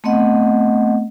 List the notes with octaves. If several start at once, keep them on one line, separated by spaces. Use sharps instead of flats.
A3 B3 C4 D#5 F#5